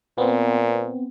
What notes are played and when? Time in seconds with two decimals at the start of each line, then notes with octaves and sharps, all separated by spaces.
0.18 A#2 B3 C4